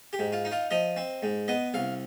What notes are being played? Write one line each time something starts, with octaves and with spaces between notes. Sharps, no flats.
G4
G#2
F4
D#4
F4
F3 D#5
C4
G#2
B3 D#5
C2 F5